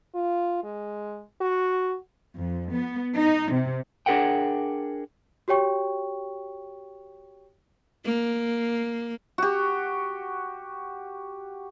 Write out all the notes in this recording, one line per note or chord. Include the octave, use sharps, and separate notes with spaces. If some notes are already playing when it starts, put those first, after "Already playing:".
F4
G#3
F#4
F2
B3
D#4
C3
D4 G#4 A#4 F#5 G5
F#4 G4 C#5 G5 C#6
A#3
F#4 G4